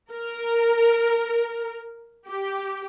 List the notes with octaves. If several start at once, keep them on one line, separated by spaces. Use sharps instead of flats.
A#4
G4